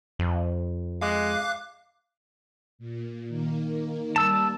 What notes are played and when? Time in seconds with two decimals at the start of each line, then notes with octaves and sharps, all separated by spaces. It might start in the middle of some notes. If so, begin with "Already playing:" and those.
0.19 F2
1.01 G#3 F5 D6 F#6
2.79 A#2
3.28 D#3 A#3
4.16 G3 A#3 A5 E6